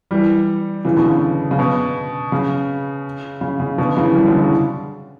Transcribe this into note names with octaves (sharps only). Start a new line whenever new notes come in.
E3 G3
C#3 E3
B2 D3
C#3
C#3
B2
C#3
C#3
C#3
B2 D3
C#3 E3
E3 G3
D3 F#3
C#3 E3